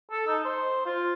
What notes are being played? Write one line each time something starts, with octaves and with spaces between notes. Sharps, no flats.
A4
D#4
C5
F4